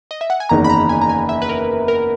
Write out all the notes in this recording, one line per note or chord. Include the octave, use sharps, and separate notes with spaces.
D#5
E5
F#5
G#5
F#1 E2 D#3 A#5
B5
A#5
G#5
A#5
G#5
E5
B4
A#4
A#4